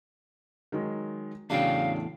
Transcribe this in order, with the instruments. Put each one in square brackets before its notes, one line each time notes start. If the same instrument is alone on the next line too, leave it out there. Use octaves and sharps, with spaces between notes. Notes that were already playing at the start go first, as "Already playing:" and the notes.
[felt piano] D#3 F#3 G#3
[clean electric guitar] E2 A2 G5 [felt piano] C#3 F#3 D4 [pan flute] F5